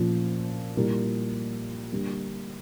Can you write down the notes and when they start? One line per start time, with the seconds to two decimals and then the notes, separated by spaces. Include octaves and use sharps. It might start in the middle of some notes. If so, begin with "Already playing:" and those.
Already playing: A#2 F3 C#4 F4
0.77 A#2 G3 A#3 E4
1.92 D3 G3 A#3